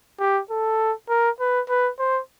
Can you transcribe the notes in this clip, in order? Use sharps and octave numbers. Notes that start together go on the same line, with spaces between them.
G4
A4
A#4
B4
B4
C5